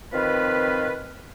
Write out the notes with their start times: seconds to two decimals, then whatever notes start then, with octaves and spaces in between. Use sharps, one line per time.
0.13 D#3 F3 C4 F4 B4